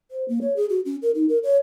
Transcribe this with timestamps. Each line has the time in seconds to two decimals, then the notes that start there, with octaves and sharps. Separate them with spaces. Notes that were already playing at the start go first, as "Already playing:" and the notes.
0.11 C5
0.28 A#3
0.41 C#5
0.56 G#4
0.69 F#4
0.85 C#4
1.02 A#4
1.15 D#4
1.29 A#4
1.43 C#5